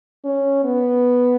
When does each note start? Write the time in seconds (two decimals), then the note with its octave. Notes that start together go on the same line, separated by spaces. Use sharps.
0.25 C#4
0.64 B3